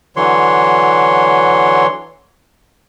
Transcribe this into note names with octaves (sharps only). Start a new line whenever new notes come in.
D3 E3 F#3 C#5 C6